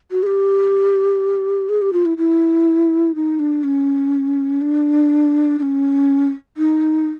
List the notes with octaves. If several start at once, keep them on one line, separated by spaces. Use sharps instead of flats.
F#4
G#4
G4
G#4
G4
F4
E4
E4
D#4
D4
C#4
D4
D4
C#4
D#4